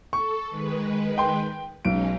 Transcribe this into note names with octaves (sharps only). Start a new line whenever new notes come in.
A4 C#6
D#3 G#3 B4
G5 C6
B1 G#3 C#4 D#4 D7